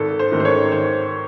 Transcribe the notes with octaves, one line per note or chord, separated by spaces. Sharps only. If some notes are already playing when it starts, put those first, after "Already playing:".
Already playing: G#1 A4
C5
G#2 D#3 A3
C5
C#5
G#1 C5